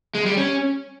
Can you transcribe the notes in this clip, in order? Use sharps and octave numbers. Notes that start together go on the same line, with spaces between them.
G#3
G3
C#4